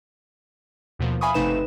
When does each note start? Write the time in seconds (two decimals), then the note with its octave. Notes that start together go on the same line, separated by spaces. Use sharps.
0.99 D#2 B2 F3 A#3
1.21 E5 F5 G#5 B5 C#6 D#6
1.34 G1 C3 A3 D#4 B4 E7